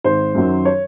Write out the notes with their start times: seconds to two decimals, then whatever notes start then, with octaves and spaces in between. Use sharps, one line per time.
0.04 G#1 C5
0.35 F#2 D#3 F#3
0.65 C#5